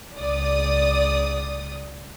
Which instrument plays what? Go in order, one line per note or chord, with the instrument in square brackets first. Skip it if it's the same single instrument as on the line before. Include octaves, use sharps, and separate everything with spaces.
[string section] C#2 D5 D#6